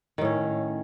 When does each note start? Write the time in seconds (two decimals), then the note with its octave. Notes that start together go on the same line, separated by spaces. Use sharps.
0.18 D#3
0.21 A2
0.25 C#4